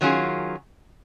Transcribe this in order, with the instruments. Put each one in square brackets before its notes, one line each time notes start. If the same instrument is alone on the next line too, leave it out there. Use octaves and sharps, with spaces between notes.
[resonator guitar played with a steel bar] D#3 F#3 C#4 F4 G#4